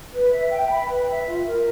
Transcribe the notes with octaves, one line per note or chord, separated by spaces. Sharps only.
B4
E5
G5
B5
B4
E5
F4
A#4